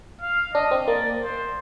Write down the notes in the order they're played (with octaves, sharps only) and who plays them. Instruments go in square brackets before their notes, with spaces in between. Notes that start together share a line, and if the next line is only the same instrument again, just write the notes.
[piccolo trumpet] F5
[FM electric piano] D4 [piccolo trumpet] D#5
[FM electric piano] C4
[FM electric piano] A#3 [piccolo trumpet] D5
[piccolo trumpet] C5